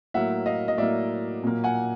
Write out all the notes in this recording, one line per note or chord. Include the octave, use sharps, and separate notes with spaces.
A2 F#3 A#3 E5 F#5
D#5 F5
D#5
A2 F#3 A#3 D5 E5
A#2 F#3 A#3
F#5 G#5